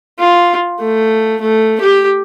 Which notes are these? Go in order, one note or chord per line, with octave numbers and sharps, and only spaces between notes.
F4
A3
A3
G4